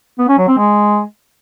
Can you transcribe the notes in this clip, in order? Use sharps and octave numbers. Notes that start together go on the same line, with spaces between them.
B3
C#4
F#3
C4
G#3